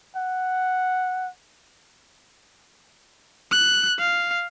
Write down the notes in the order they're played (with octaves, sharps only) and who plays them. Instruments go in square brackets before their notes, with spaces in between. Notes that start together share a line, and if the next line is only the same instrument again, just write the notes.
[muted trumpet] F#5
[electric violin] F#6
F5